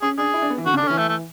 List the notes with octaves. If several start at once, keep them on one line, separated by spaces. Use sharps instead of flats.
C#4 G#4
D4 G#4
E4
D4
B3
E3
D3 F#4
C#3
D4
D3
C#4
E3
A3
A3